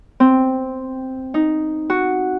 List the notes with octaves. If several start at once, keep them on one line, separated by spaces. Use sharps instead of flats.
C4
D#4
F#4